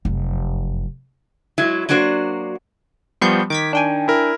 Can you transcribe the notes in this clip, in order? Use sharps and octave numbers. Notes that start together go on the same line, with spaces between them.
F1 F#2
F#3 G#3 E4
F#3 A#3 D4 F#4 C5
F3 G3 B3 C6 C#6 G6
D#3 D6 G#6 B6
D4 G5 G#5
E4 A#4